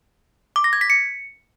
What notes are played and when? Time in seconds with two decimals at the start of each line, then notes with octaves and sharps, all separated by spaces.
0.56 D6
0.64 A#6
0.73 G#6
0.81 B6
0.90 C#7